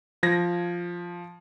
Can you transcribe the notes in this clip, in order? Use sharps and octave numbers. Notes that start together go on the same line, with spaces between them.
F3 G#6 A#6